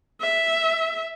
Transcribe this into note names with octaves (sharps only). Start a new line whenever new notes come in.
E5